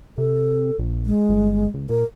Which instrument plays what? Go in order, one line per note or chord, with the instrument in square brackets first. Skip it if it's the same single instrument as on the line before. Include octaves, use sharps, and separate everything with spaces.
[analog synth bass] C3 [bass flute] A4
[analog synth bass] A#1
[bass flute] G#3
[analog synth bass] G1
C#2
[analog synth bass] A#2 [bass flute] A#4